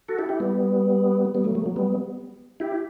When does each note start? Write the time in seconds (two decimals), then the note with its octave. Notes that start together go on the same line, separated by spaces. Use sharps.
0.08 F#4 A4
0.19 E4 G4
0.29 E4 G4
0.40 G3 B3
1.34 G3 B3
1.44 F#3 A3
1.55 F#3 A3
1.66 F#3
1.76 G3 B3
2.60 E4 G4